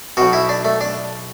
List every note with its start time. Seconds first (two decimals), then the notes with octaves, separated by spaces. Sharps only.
0.17 B1 B2 F#4
0.33 E4
0.49 D4
0.65 A3
0.81 D4